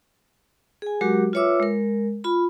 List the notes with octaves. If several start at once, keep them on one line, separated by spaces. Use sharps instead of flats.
G#4 G#5
F#3 G#3 F#4 G4 A#4 D6
F4 B4 C#5 E5 D6 E6
G#3 A#4
F4 B5